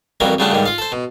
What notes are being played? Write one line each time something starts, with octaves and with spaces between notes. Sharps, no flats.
C2 F2 E3 G3 A#3 F#4
C#3 F3 G3 A3 D4 F#5
D#2 G#2 D3 G3
F4 F5
A4 C5
B2